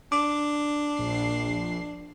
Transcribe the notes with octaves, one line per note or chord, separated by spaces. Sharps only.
D4 D6
A#1 C7